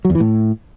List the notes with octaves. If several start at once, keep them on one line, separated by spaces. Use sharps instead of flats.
F#3
E2
E3
A2